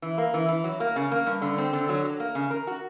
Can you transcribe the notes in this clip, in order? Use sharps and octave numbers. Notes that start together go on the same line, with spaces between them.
E3
A#3
E3
E3
F#3
A#3
C#3
A#3
G2
D3
C4
D3
F#3
F#3
A#3
C#3
A#4
F#4